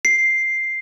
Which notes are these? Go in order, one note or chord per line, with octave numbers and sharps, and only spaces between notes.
C7